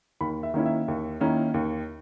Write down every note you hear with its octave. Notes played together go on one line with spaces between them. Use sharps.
D#2 B5
E5
D#3 A#3 C#4 E4
E5
D#2
D#3 A#3 C#4 E4
D#2